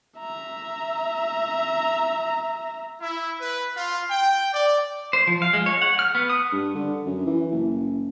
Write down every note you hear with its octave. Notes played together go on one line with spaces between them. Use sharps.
E5 A#5
E4
B4
F4
G5
D5
C5
F3
F5
G#3
C#5
F#5
F6
B3
D#6
G2
D3
F#2
E3
F#1